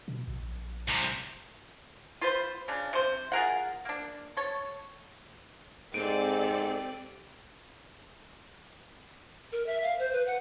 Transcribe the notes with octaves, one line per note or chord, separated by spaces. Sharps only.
B2
A#1
C2 C3
F4 B4 C5
C#3 D4
C3 C5
F4 G#4 A#4 F#5
A#3 D4
A4 C#5
G#2 C4 G4 A4 D5 D7 D#7
A#4
E5
F5
C5
B4
F#5